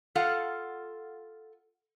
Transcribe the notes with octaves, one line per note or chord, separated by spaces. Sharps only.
F4 A4 F5 F#5